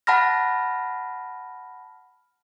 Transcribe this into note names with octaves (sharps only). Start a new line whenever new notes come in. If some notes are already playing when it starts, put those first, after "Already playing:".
F#5 A5 B5 F6 A#6